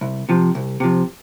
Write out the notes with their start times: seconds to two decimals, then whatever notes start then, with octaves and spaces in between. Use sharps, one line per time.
0.01 C2
0.29 C3 F3
0.55 C2
0.80 C3 F3